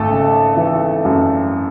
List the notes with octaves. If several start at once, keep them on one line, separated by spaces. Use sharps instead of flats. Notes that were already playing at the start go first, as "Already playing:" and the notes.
Already playing: G#1 A3 A4
C#3
E3
F#2